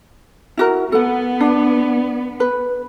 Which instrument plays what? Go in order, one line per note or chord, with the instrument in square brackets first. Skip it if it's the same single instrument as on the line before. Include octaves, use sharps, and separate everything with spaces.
[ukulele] E4 F#4 A#4
[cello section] B3 [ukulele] A4 F#5
[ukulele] D4
B4